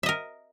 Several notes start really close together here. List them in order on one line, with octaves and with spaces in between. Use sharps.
E5 D#5 A#4